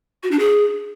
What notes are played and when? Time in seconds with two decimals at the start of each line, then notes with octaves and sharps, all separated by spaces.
0.23 F#4
0.31 D4
0.39 G#4